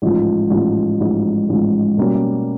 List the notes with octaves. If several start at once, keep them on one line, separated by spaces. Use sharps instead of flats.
A1 G#2 F3
A1 G#2 F3
A1 G#2 F3
A1 G#2 F3
B2 G3 A#3 C#4